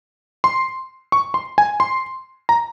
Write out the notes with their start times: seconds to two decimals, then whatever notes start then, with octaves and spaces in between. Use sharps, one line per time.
0.44 C6
1.12 C#6
1.34 C6
1.58 G#5
1.80 C6
2.49 A#5